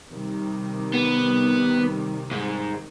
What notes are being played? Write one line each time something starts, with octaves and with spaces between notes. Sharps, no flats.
C3 D#3 G3
B3
G#2